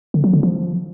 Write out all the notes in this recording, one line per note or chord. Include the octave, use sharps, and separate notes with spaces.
D3
F#3
D3
F3